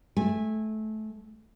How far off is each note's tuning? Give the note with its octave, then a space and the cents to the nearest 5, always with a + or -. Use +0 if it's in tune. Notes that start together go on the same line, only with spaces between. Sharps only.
A3 -20 G#5 -15